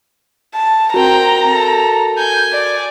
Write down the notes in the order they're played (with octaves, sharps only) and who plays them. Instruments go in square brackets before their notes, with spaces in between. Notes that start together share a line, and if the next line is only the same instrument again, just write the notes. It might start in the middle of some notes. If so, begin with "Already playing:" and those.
[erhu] A5
[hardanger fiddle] C4 G5 [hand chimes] F#4 A#4 [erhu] A#5
[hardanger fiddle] A4
[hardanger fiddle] G#5 [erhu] G6
[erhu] D5